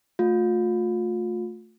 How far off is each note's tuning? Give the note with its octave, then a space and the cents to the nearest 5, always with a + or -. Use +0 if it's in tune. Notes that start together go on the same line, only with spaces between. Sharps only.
A3 +0 F4 +35